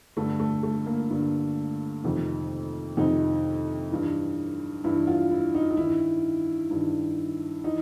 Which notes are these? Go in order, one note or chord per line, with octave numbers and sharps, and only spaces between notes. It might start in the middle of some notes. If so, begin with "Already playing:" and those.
G2 D3 A3
A3
A3
A#3
G2 D3
F2 C3 D#3
F2 C3 D#3 D#4
G2 E3
G2 E3 E4
F4
E4
D#4
D#4
G2 D#3 E4
G2 D#3
E3 D#4